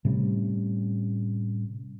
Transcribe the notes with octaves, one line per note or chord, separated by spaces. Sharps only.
A2 C3 G3 C#4